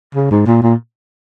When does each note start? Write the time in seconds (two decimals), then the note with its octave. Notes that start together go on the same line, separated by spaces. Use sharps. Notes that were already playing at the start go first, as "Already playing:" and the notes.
0.15 C#3
0.31 G#2
0.46 A#2
0.62 A#2